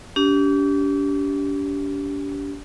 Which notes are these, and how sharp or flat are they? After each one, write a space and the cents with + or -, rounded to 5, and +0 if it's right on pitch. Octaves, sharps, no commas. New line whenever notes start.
D4 -40 G4 -10